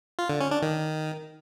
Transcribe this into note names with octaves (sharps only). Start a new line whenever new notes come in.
F4
D3
C#4
D4
D#3